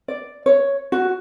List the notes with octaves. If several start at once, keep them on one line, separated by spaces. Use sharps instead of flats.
D5
C#5
F#4